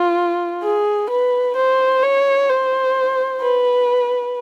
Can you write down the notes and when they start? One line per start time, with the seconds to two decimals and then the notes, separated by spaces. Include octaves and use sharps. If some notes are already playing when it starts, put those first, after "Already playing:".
Already playing: F4
0.63 G#4
1.09 B4
1.56 C5
2.03 C#5
2.49 C5
3.42 B4